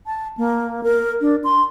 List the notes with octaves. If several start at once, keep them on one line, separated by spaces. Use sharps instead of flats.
A5
A#3
A#4
D4
C6